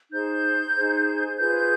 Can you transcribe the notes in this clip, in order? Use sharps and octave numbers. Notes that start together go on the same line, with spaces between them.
D#4 G#4 C5 G6
D#4 G#4 C5
F4 G#4 B4 G6